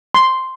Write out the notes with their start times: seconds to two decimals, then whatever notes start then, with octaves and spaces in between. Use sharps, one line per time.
0.14 C6